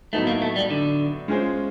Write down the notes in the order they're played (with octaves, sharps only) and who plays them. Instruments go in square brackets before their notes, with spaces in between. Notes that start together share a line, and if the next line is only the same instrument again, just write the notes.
[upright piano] A2 F#3 B3 D#4 [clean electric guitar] A3
[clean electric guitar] A#3
A3
G3
D3
[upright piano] G#3 C#4 F4 G#4 C5